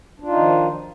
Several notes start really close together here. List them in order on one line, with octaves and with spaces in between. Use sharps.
D4 F4 D#4 D#3 F3